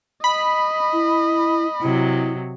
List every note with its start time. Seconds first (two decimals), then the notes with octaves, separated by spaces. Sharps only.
0.24 D#5 B5
0.93 E4
1.81 C3 F#3 E4